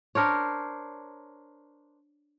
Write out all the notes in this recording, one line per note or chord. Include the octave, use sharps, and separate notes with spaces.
D4 A#4 C5 C#5